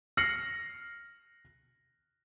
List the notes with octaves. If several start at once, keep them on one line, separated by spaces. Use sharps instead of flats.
F6 A#6 C7 C#7 F#7